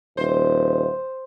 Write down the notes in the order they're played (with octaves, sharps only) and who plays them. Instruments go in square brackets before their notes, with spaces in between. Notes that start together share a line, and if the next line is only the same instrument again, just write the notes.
[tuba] D#1 [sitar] C5